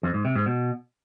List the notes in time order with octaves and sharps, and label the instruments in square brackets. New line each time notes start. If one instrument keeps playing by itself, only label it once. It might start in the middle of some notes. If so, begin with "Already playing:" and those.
[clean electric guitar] F2
G#2
C3
G#2
B2